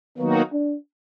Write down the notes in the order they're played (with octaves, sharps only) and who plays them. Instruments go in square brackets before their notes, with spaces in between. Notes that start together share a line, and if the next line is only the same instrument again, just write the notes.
[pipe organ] D#3 F#3 A#3 D#4 F#4 [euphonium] B3
[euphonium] D4